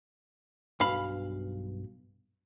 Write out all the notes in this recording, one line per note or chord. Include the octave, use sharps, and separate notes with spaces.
B1 G2 F5 B5